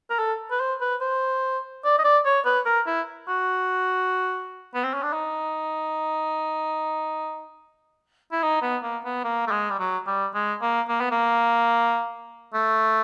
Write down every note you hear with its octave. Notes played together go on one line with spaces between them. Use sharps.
A#4
A4
B4
C5
B4
C5
D5
D#5
D5
C#5
B4
A#4
E4
F#4
B3
C4
C#4
D4
D#4
E4
D#4
B3
A#3
B3
A#3
A3
G#3
G3
F#3
G3
G#3
A#3
A#3
B3
A#3
A3